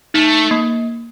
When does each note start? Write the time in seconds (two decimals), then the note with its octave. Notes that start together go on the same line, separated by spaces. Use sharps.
0.14 A3 D#4
0.51 A#3